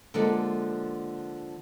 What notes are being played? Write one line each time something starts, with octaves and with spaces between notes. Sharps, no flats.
D3 F3 G#3 A#3 A4